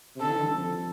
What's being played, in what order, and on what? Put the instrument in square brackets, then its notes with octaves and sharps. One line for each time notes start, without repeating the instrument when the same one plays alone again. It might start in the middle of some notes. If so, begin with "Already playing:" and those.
[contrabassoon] C3
[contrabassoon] D3 [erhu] A4
[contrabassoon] E3
D3
G2
F2